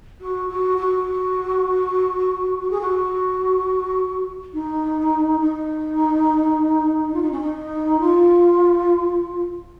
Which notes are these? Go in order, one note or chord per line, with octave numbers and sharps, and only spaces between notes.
F#4
F#4
F#4
G#4
F#4
D#4
D#4
F4
D#4
C#4
D#4
F4